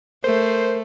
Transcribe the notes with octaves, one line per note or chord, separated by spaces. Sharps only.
A3 A#4 C5